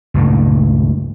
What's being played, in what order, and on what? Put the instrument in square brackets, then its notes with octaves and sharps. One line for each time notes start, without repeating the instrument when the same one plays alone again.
[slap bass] C#2 G2 A#2 A3